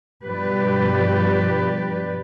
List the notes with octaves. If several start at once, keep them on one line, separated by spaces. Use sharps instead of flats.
G2 B2 F3 G4 B4 D5